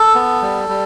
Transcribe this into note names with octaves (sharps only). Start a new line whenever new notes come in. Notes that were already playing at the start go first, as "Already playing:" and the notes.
Already playing: A4
B3
G3
G3